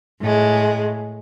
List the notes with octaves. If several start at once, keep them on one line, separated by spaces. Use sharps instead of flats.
A2 G#3